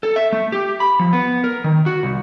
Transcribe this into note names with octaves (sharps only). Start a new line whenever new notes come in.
A4
E5
A3
G4
B5
F3
B3
A#4
D#3
F#4
C2